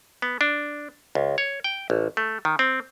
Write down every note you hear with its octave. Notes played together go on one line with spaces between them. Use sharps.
B3
D4
C#2
C#5
G5
A1
A3
D#3
C4